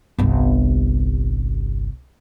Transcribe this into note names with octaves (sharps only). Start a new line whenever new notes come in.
G1 C2